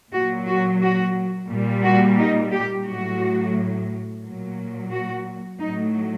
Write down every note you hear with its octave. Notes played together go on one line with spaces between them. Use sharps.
A#2 F#3 F#4
F#4
F#4
A#2 G3
F#4
D#4
G4
A2 F#3 F#4
A#2 F#3
F#4
A2 F#3 D#4